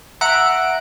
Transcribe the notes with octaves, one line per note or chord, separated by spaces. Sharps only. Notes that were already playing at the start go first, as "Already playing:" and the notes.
E5 F#5 A#5 F#6 D7